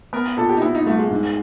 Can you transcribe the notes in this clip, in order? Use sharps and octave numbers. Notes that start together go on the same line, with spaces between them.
B3 A#4
A#2 A4
G4
D#4
B3 E4
D#4
C2 A3
G#3
G#2